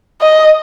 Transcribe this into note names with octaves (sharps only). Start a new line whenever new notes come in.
D#5